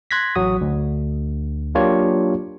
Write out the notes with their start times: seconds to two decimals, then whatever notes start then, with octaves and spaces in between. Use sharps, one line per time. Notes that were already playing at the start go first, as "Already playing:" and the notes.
0.11 C6 F#6 G#6 A#6 B6
0.35 A1 F#3 F#4 D#6
0.61 D2
1.75 F#3 A#3 D4 F4 G4 C#5